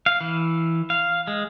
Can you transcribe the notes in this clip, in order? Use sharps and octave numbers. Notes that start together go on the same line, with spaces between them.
F5
E3
F5
G#3